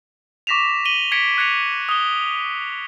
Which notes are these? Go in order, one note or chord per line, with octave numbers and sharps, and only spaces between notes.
C#6 D6 A#6 B6 E7 F7
D#7 F#7 G7
G#6 A#6 B6 C#7 D7
F#6 G#6 A#6 C#7 F7
D#6 G7